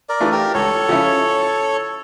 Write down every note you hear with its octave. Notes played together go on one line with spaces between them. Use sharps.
A#4 D5
E3 A3 D4 F4
G4 A#4
C#2 A4 C#5
C#3 F3 C#4 E4